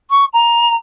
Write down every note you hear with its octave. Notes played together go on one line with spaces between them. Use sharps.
C#6
A#5